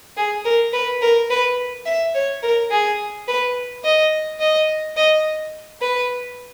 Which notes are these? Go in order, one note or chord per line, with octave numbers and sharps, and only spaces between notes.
G#4
A#4
B4
A#4
B4
E5
C#5
A#4
G#4
B4
D#5
D#5
D#5
B4